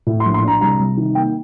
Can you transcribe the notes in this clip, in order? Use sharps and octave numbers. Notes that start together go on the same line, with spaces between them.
A2
C6
A#1
C6
D4 A#5
C2 A#5
C2
D#3
A#3 G5